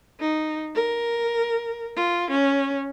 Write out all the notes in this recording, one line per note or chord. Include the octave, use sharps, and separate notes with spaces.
D#4
A#4
F4
C#4